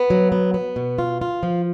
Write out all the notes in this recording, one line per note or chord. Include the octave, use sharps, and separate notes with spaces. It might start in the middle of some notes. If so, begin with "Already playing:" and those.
Already playing: B3
F#3
B3
B3
B2
F4
F4
F3